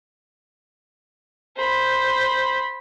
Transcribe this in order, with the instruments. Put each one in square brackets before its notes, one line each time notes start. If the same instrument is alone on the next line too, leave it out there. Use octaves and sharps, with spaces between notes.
[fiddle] C5 B5